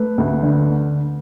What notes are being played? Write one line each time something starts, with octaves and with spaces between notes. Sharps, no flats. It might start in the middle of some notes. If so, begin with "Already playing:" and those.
Already playing: A3 B4
D2
D3